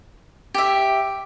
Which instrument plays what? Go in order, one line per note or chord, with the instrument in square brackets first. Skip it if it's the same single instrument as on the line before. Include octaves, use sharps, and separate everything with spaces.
[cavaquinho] G4 E5